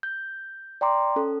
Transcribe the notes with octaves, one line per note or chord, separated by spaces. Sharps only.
G6
D5 G5 A#5 C6 D6
C#4 A4